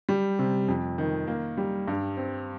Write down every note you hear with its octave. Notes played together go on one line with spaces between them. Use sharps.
G3
C3
F2
D#3
A#3
G3
G2
C4